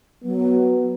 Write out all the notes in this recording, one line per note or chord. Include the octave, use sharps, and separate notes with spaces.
F#3 B3